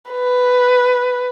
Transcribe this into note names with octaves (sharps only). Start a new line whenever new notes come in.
B4